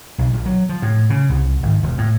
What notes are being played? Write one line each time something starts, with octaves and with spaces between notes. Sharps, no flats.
B1
A#1
F#3
F3
A2
C#3
C2
G#1
E1
A2